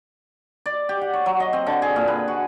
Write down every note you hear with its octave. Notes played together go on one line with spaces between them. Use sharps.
D5
G4
F#5
C#5
F#3
D#5
C4
D3
G#4
A#2
B4
F#4